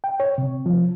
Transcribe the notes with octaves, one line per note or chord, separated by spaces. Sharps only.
G5
C#5
C3
F3